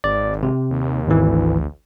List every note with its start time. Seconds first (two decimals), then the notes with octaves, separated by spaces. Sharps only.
0.04 G#1 D5
0.43 C3
0.70 D#2
1.08 G#1 E3
1.26 D2